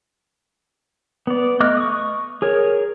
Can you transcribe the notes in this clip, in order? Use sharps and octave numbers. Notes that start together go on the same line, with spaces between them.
B3 D5
A3 D#5 D6 F6 F#6
C#6 D#6
G#4 A#4 C#5